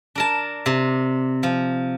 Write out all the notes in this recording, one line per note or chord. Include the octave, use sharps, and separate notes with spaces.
D4 A#4 A5
C3
F3